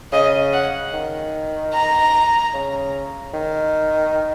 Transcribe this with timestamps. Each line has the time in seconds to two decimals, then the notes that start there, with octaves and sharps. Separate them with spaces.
0.12 C#3 D#5
0.53 F#5
0.93 D#3
1.73 A#5
2.54 C#3
3.34 D#3